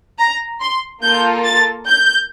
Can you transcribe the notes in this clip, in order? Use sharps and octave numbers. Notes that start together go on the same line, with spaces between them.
A#5
C6
A#3 F4 A4 G6
A6
G6